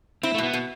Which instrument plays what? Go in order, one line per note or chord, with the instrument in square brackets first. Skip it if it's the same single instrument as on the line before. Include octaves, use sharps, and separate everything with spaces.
[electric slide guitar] C4 [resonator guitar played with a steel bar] E4
[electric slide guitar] A3
[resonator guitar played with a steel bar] B2 [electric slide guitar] B3
[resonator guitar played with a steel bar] B2